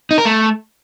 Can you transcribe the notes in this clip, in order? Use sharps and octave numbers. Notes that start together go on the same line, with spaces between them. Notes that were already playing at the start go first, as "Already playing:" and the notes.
D#4
A#4
A3